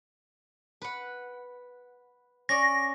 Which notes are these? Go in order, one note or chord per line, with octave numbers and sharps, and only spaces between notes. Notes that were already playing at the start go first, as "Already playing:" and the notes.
B4 F#5
C#4 D5 A#6